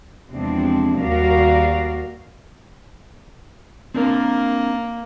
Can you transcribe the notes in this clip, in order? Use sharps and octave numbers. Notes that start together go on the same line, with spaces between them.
E2 C3 F3 G#3 C4 D4
D#2 G3 F#4 A#4 D5 F5
A#3 C4 D4 A#4